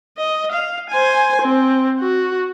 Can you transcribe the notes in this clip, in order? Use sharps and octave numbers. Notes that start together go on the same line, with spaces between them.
D#5
F5
C5 G#5
C4
F#4